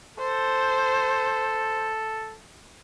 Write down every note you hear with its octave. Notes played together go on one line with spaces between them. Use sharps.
A4 C5